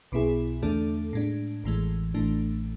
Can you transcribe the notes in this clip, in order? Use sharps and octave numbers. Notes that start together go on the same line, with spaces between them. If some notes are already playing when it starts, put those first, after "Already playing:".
B1 B2 B3 E4 G#4
E2 D3 A3 D4 A4
A2 G#3 D4
A1 A2 E3 G#3
A1 A2 E3 A3 D4